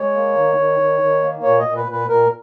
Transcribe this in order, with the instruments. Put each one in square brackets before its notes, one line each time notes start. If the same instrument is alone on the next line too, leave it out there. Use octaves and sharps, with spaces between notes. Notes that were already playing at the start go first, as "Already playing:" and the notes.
Already playing: [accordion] G#3 C#5
A#3
D#3
D#3
D#3
D#3
A#3
A#2 C#5
D#5
A#2
B4
A#2 B4
A#2 A#4